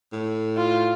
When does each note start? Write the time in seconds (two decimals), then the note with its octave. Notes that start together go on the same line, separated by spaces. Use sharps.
0.13 A2
0.57 F4